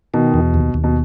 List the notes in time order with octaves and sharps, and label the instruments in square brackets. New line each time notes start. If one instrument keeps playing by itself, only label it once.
[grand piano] B2 [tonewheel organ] D#3
[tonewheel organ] E2
D#2
D#2
[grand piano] B2